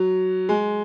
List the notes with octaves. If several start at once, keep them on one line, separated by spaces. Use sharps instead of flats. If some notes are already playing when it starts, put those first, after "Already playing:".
Already playing: F#3
G#3